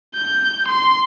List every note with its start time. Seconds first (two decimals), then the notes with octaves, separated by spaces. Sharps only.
0.15 G6
0.68 C6